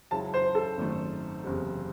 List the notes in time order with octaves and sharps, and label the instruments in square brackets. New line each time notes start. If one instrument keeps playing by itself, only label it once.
[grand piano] C#2 C#3 F#3 C#4 E4 [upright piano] A5
[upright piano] C5
A4
[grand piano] G#1 F#2 D#3 A3
F#1 E2 C3